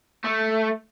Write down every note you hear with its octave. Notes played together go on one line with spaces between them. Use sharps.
A3